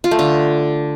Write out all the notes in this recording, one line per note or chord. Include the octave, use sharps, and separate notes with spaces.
F4
A3
D3